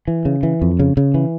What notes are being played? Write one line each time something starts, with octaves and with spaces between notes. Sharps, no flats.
E3
C#3
E3
F2
C#3
C#3
E3